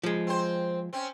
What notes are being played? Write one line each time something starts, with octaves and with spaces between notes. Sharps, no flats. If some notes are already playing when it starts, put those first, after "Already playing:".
F3 G#3
C4 C5
C4 C#4